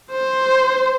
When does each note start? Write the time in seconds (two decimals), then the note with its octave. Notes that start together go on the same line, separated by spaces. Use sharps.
0.11 C5